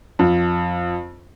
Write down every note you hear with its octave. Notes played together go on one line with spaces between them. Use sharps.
F2